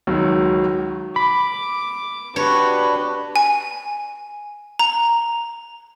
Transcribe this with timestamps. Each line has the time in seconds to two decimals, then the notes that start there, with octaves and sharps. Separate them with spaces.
0.07 C#2 D#3 F#3
1.16 B5 D6
2.36 D4 F#4 G4 B4 C#5
3.36 G#5
4.79 A#5